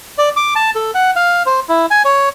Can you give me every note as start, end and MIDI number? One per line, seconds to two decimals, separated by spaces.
0.18 0.29 74
0.36 0.54 86
0.55 0.70 81
0.75 0.91 69
0.94 1.11 78
1.16 1.43 77
1.46 1.60 72
1.69 1.86 64
1.91 2.03 80
2.05 2.29 73